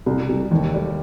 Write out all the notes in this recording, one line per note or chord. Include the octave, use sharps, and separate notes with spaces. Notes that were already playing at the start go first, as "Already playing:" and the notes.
C2
C2
D#2
G3